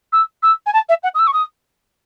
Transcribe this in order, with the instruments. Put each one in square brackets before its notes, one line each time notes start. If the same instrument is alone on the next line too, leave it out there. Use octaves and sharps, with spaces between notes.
[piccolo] E6
E6
G#5
A5
E5
F#5
D#6
E6
C#6
D#6